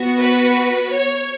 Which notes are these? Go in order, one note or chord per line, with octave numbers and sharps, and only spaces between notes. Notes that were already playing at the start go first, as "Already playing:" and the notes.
Already playing: B3 F#4
B4
C#5